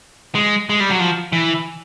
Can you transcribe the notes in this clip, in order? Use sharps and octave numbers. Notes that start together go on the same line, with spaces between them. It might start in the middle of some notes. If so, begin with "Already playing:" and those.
G#3
G#3
G3
F#3
F3
E3